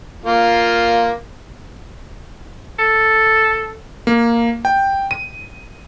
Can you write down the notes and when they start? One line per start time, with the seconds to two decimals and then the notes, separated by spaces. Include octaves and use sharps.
0.25 A#3 F4
2.79 A4
4.07 A#3
4.65 G5
5.11 D#7